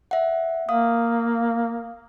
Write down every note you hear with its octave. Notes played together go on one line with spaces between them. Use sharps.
E5 F#5
A#3 F5 D#6